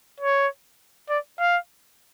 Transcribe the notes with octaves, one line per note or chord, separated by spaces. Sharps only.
C#5
D5
F5